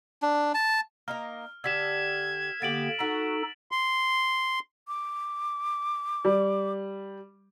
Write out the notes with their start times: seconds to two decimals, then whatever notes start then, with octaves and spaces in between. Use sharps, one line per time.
0.22 D4
0.54 A5
1.08 A#3 D#4 A#4 F6
1.64 D3 G4 E6 G#6 B6 E7
2.62 D3 A#3 B3 G4 A6 D7 F#7
3.00 D#4 F#4 A4 B6
3.72 C6
4.88 D6
6.25 G3